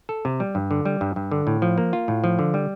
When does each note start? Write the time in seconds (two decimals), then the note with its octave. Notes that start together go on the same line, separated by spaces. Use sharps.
0.09 A4
0.25 C3
0.40 G3
0.55 G2
0.71 D3
0.85 G3
1.01 G2
1.16 G2
1.32 D3
1.47 A2
1.62 F3
1.78 A#3
1.93 F4
2.08 A2
2.24 F3
2.39 D3
2.54 G3